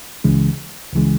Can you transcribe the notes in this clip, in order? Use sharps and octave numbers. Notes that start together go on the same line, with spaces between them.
C#2 C#3 E3 G#3
C#2 C#3 E3 G#3